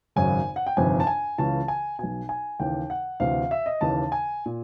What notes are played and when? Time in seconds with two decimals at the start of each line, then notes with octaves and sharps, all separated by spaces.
0.16 G#1 F#2 C#3 G#5
0.56 F#5
0.67 G5
0.77 G1 F2 C3 D#3 G#5
1.00 A5
1.07 G#5
1.38 C#2 C#3 E3 A5
1.68 G#5
1.99 B1 B2 G#5
2.29 G#5
2.60 D#2 C#3 E3 G5
2.90 F#5
3.20 D2 C3 E3 F5
3.51 E5
3.66 D#5
3.81 D#2 C#3 E3 A5
4.12 G#5
4.46 A#2